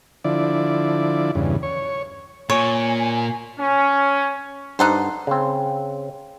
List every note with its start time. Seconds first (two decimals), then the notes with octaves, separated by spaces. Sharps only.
0.24 D3 F3 E4 D5
1.35 E2 G2 C#3
1.63 C#5
2.50 A#2 C#5 G#5
3.59 C#4
4.79 G2 D#4 A4 C5 F#5
5.27 C#3 C4